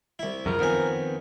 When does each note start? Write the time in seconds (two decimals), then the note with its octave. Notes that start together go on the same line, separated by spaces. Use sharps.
0.19 C2 E4
0.46 F#2 C#3 F3 A#4
0.59 F2 D#3 B3 C4 G#5